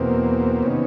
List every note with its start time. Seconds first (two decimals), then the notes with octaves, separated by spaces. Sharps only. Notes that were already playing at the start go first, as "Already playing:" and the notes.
Already playing: E2 B2 A#3 C4
0.62 C3 D#3 B3 C#4